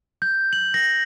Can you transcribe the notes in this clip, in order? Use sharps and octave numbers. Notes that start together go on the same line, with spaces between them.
G6
F#7
A#6